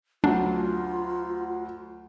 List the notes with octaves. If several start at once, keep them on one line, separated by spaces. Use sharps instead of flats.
D2 F#3 D4 F4